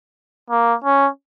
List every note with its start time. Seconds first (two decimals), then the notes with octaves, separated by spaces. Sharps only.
0.50 A#3
0.84 C#4